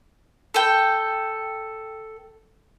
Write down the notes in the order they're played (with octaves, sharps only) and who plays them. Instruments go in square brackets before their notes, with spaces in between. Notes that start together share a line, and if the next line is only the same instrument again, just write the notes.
[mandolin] A4 G5